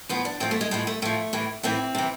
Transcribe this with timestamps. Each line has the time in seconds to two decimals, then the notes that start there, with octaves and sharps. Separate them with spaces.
0.09 A2 F3 B3
0.25 D4
0.40 A2 F3 C4
0.51 A3
0.61 G#3
0.71 A2 F3 G#3
0.87 A3
1.02 A2 F3 A3
1.33 A2 E3
1.63 A2 E3 C4
1.95 C3 E3